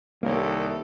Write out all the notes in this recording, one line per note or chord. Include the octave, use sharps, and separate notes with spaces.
C2 D#3 A#3 G4 A4 A#4 C#5